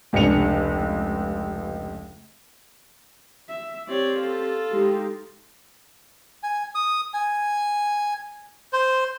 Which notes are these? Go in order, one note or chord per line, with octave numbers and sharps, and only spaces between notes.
F1 C#2 C3 D4 C#7 F7
E5
C4 G4 C#5 D5
F4 A4
G#3 D#4 G4
G#5
D#6
G#5
C5